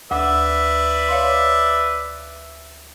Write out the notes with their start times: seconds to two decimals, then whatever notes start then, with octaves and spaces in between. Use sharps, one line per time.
0.11 D2 B4 D5 E5 D6
1.09 C#5 F5 C6